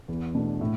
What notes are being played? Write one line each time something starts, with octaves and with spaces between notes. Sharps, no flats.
E2
B2 A3 D4
A2